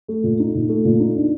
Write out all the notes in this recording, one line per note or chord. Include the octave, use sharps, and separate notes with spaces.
A3
A#2
D#4
A#2
A3
A#2
D#4
D4